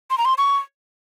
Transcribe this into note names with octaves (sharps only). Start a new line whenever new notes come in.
C6
A#5
C6
C#6